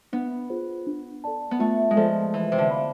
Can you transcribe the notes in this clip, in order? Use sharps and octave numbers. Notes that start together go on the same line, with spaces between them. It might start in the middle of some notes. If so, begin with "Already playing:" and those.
B3 D4
F4 G#4 C5
D4
A4 D5 A5
B3
A3 F4
G#3
F3 A4 D5 A5
E3 B4
C3
D3
F5 B5